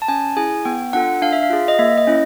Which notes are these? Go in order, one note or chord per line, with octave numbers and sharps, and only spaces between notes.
A5
C#4 G#5
E4 G#4 G#5
B3 G5
D4 F4 A4 F#5
D4 F5
E5
F5
F4 G#4
D#5
A#3 E5
D#5
C#4 E4